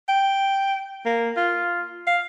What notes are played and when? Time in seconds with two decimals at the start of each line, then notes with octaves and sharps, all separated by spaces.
0.08 G5
1.05 A#3
1.37 F4
2.07 F5